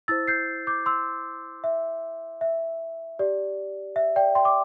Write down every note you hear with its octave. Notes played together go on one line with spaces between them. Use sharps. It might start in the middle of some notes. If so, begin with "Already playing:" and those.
E4 C5 E6 A6
G6 C7
D6 G6
C6 E6
E5
E5
G4 D5
E5
D5 G5
G5 C6
D6